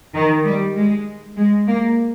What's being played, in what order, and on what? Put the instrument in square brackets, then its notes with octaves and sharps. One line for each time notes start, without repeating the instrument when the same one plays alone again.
[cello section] D#3
G3
G#3
G#3
A#3